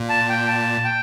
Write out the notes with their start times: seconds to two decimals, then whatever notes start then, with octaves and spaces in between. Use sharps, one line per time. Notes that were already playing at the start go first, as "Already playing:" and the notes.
Already playing: A#2
0.09 A5
0.29 G5
0.48 A5
0.84 G5